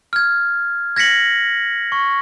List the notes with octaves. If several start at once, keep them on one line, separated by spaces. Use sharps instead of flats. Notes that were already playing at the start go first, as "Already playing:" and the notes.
F6 G#6
G#6 A#6 B6 C#7 F#7
C#6